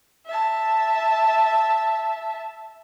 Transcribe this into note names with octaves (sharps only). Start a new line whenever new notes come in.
E5 A5